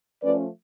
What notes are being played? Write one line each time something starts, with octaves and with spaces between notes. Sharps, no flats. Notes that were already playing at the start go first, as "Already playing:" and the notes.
F3 A3 C#4 B4 D5